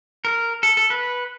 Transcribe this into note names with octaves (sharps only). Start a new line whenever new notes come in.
A#4
A4
A4
B4